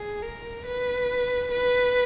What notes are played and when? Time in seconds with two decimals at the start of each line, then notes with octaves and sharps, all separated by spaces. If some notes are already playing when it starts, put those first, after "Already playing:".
Already playing: G#4
0.24 A#4
0.66 B4
1.52 B4